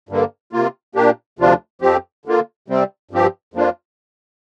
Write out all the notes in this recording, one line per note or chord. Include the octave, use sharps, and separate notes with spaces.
G2 D3 A#3
C3 A#3 F4
A#2 A#3 D4 G4
D2 C3 F3 D4 F4
F2 F3 C4 G4
D3 A#3 F4
C3 G3 C4
G2 F3 C4 G4
F2 F3 A#3 D4 F4